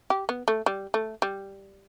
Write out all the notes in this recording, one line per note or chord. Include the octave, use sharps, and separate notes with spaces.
G4
B3
A3
G3
A3
G3